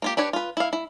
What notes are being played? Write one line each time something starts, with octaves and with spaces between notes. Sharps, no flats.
A#3 F4 G4
D4 G4 B4 C#5
F4 B4
E4 F5
E4